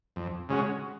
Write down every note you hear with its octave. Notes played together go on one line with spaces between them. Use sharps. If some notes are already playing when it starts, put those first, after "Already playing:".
F2
C#3 G#3 C#4 F#4